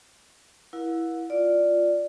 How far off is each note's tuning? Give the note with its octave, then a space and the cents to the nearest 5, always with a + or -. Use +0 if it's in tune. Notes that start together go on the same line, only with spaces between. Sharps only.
E4 +0 A#4 +40 F#5 -40
F4 +0 D5 +0